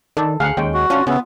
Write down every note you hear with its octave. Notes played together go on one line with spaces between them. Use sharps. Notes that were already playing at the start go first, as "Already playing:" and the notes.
D#3 A4 D5
D2 G#4 F5 F#5
D#2 G#3 C#4 G5
F#4
G#1 C#4 D4 F4
C#3 B3 C#4 F#4 E5